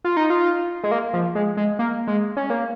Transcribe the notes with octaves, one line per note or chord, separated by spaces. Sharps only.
F4
D#4
F4
G#3
A#3
F3
G#3
G#3
A#3
G#3
C#4
A#3